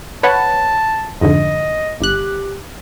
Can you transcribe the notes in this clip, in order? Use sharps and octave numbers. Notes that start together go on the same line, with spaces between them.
B4 C#5 F#5 A5
F2 G#2 D3 D#5
G1 G4 F#6